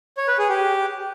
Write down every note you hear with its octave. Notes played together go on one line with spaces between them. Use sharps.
C#5
B4
G#4
G4